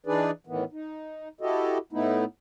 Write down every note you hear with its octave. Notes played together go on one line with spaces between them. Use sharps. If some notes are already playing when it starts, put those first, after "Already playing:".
E3 D4 D#4 G#4 B4 D5
A2 D#3 E3 B3
D#4
E4 F#4 G4 A4 D#5
A2 A3 B3 D#4 E4